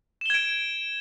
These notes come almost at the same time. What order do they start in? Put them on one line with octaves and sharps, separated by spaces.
E7 G7 G#6 D7